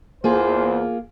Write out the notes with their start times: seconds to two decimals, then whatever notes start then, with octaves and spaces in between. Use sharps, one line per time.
0.24 E2 A#3 F4 G#4 C5